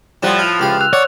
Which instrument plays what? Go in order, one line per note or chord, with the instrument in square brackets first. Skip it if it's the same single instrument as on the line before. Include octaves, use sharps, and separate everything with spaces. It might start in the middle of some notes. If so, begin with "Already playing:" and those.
[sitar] A2 F3 [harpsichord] G3 F#5 [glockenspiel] C6 F#6 E7
[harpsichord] F4 [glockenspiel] F6 F7
[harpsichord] C#2 G4 F5 [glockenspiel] F6
[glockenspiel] E6 F#6 F7
[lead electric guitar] C#5 [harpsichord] D5 F#5